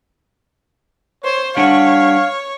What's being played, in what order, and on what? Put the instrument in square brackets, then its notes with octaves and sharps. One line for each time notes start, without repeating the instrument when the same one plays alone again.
[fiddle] C5 [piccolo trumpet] C#5
[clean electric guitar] G3 D4 F#5 [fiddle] C#5 [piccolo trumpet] F5